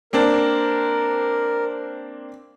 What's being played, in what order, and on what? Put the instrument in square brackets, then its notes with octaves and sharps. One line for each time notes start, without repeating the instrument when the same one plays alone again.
[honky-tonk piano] A#3 C4 D4 [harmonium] A#4